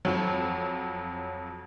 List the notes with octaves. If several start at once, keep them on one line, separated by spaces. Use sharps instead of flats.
F2 F#3